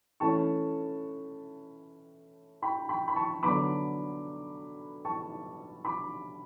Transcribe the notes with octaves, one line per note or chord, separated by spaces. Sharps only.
E3 A3 C#4 A5 C#6
G5 B5
G5 B5
B5
A5 C#6
D3 F#3 B3 B5 D6
A5 C#6
B5 D6